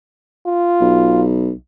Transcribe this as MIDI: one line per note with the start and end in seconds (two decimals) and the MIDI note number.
0.46 1.22 65
0.80 1.51 35